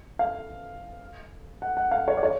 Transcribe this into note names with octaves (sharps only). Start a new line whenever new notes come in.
F5
F#5
F#5
F5
C#5
D5
C#5